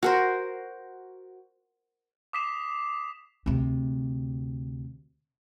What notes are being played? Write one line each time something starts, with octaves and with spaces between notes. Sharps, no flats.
F#4 A#4 C5
D6 D#6 B6 C7 E7
D2 C3